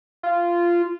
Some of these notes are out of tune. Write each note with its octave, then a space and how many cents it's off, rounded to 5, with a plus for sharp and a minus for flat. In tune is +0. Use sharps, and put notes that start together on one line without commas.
F4 -15